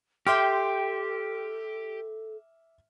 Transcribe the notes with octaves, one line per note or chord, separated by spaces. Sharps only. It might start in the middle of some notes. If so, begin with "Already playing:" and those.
G4 A4 E5 G5 C6 D6 F6 G6